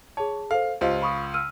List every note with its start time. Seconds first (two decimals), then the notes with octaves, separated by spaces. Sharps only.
0.17 G#4 C#5 A5
0.51 A4 C5 F5
0.81 C#2 F4 G4 C5 D#5
1.02 B5 C#6 D#6
1.34 E6 F6 D#7